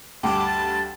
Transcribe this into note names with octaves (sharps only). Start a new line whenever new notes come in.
D2 G2 F#5 G5 A5 D6
A6